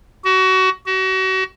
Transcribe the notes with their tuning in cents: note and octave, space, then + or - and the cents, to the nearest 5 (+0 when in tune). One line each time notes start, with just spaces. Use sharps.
F#4 +25
F#4 +35